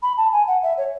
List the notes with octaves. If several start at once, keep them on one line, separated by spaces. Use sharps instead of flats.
B5
A5
G#5
F#5
E5
C#5